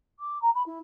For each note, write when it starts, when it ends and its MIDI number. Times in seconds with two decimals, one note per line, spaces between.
0.19 0.40 86
0.41 0.49 82
0.54 0.62 83
0.66 0.79 64